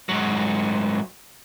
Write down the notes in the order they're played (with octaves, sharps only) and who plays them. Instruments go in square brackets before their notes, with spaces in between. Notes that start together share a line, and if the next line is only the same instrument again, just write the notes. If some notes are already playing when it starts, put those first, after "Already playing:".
[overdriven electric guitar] G#2 F#3